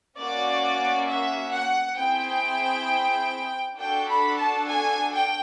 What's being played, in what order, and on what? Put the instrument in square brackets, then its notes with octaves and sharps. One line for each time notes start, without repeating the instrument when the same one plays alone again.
[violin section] A#3 C#4 F#4 D5
E5
F#5
C4 E4 G#4 G5
D4 F#4 A4 G5
B5
A5
G#5
G5